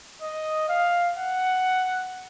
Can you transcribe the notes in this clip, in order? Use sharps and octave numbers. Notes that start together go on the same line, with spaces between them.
D#5
F5
F#5